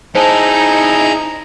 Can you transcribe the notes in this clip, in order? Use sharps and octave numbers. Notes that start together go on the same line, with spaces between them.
D#4 E4 G#4 C5 D#5 A5 A#5